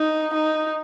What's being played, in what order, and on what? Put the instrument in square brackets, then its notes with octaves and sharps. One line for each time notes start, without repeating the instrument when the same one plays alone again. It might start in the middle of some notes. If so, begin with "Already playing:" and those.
Already playing: [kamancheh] D#4
D#4